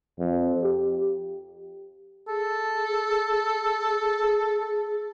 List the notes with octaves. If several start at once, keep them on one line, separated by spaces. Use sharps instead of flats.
F2
G4
G#4 A4